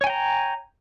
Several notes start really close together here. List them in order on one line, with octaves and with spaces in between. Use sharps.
C#5 G#5 G5 A#5